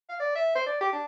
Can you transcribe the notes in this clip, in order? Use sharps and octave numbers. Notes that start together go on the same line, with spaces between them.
F5
D5
E5
C5
D5
G4
D4